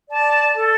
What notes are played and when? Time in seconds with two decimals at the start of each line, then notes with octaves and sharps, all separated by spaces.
0.08 D5 A5
0.54 A4